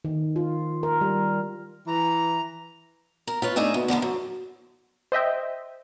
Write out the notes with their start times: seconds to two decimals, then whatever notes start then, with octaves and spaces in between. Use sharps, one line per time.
0.05 D#3
0.36 F4
0.83 A#4
1.01 G3
1.87 E3 A#5
3.27 A#4
3.42 F4 B4 C#5
3.56 A3 D4 D#4 E5 G#5
3.74 D2 B3
3.88 E2 D3 A#3 B3
4.02 F#2
5.12 C5 D#5 E5 G5